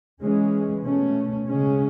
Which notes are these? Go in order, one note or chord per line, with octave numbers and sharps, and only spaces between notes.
E3 G#3 C#4
B2 A3 C#4
C#3 G#3 C#4